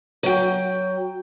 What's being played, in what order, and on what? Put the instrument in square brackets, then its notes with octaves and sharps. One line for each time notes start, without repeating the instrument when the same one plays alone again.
[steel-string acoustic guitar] F#3 G5